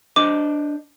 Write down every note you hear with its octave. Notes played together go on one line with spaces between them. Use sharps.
D4 C5 D#5 D6